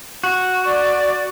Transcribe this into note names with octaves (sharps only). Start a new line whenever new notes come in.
F#4
D5